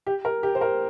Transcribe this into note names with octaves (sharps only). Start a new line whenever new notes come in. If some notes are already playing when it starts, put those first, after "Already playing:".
G4
A#4
G4
C5
A#4